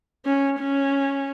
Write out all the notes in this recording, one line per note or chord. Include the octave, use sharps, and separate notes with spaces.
C#4
C#4